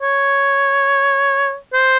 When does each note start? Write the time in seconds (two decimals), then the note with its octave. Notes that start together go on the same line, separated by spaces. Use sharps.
0.01 C#5
1.73 C5